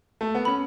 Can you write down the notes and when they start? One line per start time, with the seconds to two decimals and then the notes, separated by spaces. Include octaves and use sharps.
0.21 A3
0.35 B3
0.45 C#4 B5